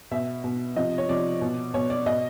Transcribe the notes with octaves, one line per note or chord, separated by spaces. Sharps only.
B2 E5
B2
C3 F3 D#5
C#5
C3 F3 D5
B2
B2 C#5
D5
B2 D#5